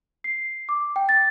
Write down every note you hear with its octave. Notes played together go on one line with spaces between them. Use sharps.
C7
D6
G5
A6